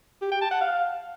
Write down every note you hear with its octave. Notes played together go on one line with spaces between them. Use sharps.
G4
G5
A5
F#5
F5